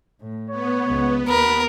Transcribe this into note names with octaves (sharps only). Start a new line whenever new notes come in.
A2
B3 C#5
C#2
D#2 A#4 B5